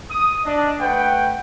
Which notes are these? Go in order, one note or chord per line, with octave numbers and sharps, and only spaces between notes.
D#6
D4 D#5
A3 B4 F#5 G5